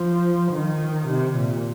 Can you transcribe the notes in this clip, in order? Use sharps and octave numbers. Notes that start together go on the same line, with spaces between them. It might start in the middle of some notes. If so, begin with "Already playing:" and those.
Already playing: F3
D#3
C3
A#2